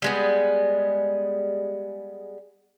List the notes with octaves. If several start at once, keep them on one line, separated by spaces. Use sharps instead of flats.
G3 G#3 B3